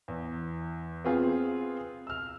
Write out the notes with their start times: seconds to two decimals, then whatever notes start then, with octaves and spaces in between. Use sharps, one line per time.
0.08 E2
1.05 B3 C4 F4 G#4 F5
2.07 E6 F6